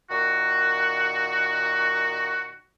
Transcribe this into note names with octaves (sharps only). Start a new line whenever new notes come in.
A#2 D#3 F#4